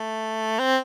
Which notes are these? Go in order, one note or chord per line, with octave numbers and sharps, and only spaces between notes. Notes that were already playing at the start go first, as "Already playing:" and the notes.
Already playing: A3
C4